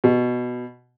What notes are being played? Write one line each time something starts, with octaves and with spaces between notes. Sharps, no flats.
B2